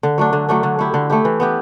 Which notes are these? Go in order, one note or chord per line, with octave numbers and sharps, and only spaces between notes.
D3
F#3 A3 D4
D3
F#3 A3 D4
D3
A3 E4 G4
D3
A3 E4 G4
E3
B3 E4 G4